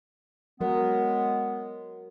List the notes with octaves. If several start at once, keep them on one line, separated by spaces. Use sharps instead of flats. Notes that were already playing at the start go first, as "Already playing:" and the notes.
F#3 G#3 B3 A#4